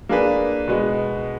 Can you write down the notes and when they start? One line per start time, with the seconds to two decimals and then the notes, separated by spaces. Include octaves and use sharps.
0.09 A#3 D4 G#4 B4
0.68 B2 G#3 B3